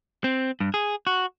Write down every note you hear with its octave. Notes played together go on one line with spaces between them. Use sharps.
C4
G2
G#4
F#4